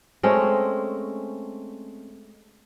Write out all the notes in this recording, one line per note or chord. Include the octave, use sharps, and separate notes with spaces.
G#3 A3 C4 C#4